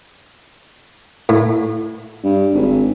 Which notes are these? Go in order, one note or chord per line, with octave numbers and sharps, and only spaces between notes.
A2
G2
G#1